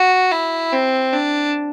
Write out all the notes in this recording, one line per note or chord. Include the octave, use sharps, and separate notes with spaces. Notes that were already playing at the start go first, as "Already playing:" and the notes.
Already playing: F#4
E4
C4
D4